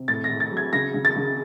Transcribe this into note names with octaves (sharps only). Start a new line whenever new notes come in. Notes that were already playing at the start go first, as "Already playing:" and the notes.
Already playing: C3
A2 A6
A#6
A2
A6
F#3
G#6
C#3 A#6
C#3
A6
C#3